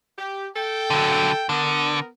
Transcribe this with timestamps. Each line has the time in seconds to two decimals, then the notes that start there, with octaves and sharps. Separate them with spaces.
0.18 G4
0.55 A4 G5
0.90 D3 F#3
1.49 D3 B3 A#4